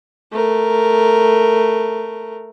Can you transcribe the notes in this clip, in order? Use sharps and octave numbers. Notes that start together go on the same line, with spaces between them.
A3 A#4